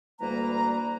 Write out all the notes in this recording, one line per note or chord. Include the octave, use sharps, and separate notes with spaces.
D2 E3 G3 A#3 B4 A#5